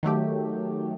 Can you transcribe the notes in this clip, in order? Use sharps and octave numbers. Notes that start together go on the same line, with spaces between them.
D#3 F#3 A3 G4